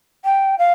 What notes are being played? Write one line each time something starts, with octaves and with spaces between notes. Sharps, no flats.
G5
F5